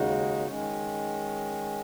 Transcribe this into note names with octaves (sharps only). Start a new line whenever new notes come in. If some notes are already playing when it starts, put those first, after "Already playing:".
Already playing: D#2 C#3 G#3 D#4 F#4
D#3 G#3 C#4